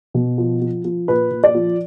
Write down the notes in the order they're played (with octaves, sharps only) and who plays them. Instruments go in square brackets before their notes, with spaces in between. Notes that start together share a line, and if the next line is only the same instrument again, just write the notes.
[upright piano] B2
F3
F3
F3
A#2 B4
A#2
D5
F3